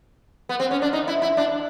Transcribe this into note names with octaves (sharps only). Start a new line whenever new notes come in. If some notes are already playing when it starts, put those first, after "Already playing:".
B3
C4
C#4
D4
D#4
E4
E4
D4